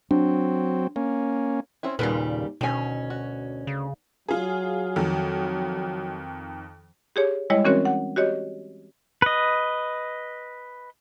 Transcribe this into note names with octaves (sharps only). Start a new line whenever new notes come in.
F#3 C4 D4
A#3 C#4
C4 C#4 E4
D#2 A#2 C#3 G3 A#4 B4
D2 B2 D#3 C#4 G#5
F#4
C#3
F#3 F4 G#4
F2 D#3
G4 G#4 C#5
G3 G#3 E4 C#5 D#5
E3 C4 C#4 F#4 A#4 C#5
F#5
F#4 G4 C#5 D#5
B4 D#5